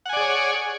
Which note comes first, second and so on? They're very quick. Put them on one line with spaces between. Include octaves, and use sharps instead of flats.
F#5 G#5 D5 G#4 C#5